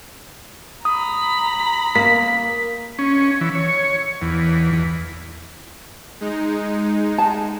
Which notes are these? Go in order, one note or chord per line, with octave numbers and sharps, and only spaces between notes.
A#5 B5 D#6
A#3 B6
C#4
E3
C#5
E2
E2
G#3 D#4
A5